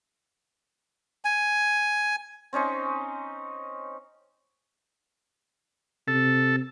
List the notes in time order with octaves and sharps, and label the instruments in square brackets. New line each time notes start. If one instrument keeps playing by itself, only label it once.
[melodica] G#5
[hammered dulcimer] C4 C#4 D#4 C5
[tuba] C3 [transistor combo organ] A4